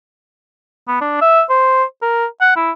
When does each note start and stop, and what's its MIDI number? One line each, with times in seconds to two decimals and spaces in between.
0.88 1.01 59
1.01 1.19 62
1.22 1.42 76
1.50 1.84 72
2.02 2.26 70
2.41 2.51 78
2.56 2.71 64